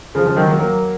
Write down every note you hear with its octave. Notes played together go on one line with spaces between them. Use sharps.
C#3 F3
C#3 F3
D#3 F#3
F#3 A#3
F#3 A#3